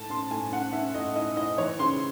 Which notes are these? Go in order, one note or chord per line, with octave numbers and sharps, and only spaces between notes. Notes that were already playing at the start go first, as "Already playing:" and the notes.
Already playing: A2 A5
C#4 C6
A2 G#5
C#4 F#5
C#4 E5
A2 D#5
E4 D#5
E4 D#5
E3 C#5
C#3 C6